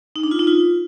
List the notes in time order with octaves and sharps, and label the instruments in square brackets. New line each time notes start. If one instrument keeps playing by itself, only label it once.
[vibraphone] D#4
D4
F4
D#4
F4